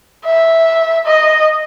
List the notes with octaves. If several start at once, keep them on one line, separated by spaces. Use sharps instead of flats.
E5
D#5